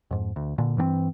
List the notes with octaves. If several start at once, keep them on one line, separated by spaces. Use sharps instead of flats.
F2 G#2
D2
A#2 D3
G2 E3 A#3 C4